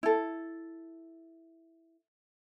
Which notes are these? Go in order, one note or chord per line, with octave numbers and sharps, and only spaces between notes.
E4 A4